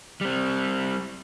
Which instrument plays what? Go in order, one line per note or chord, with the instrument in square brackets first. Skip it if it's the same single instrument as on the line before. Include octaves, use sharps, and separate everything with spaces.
[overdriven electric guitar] G3 C4